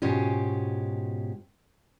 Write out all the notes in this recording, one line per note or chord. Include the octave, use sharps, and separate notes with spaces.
G#2 B2 C#4 F4 G4